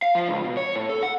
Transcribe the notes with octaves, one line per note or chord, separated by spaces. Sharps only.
F5
F3
C#2
B2
C#5
A2
A4
F#5